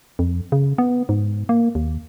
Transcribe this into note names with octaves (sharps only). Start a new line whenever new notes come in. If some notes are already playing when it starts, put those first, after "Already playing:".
F2
C#3
B3
G#2
A#3
D#2